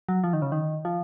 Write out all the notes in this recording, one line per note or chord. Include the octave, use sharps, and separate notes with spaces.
F#3
F3
D#3
C#3
D#3
F3